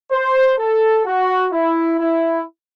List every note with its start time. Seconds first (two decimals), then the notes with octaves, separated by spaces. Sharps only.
0.11 C5
0.59 A4
1.05 F#4
1.52 E4
1.99 E4